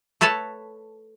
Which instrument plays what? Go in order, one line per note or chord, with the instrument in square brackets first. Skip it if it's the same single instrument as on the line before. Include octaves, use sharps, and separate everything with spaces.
[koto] A3 A4 B4 C#5 A5